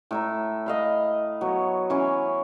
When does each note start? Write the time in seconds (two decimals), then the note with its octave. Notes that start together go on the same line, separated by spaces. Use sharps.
0.11 A2 E5 A#5
0.66 D#5 F5 B5
1.41 F#3 B3 C#5
1.90 E3 C#4 C#5